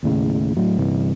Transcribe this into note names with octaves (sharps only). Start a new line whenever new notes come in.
D#2 A2 C#3
A2 F#3
G1 G2 C3 E3